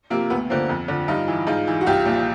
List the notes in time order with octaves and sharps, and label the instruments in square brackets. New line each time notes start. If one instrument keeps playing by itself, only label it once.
[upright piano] C3 F3 A#3
D2 B3
D3 F3 A#3 C4
F2
D3 F3
G2 D#4 F4
E3
G#2 D#4 F4
E3
F#4
C2 F4 G4
A#2 F3